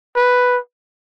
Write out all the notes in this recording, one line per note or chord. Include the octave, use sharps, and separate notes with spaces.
B4